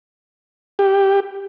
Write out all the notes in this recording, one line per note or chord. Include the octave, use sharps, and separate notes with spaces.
G4